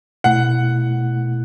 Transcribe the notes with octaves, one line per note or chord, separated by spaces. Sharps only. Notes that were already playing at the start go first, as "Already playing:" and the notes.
B2 A3 E4 F#5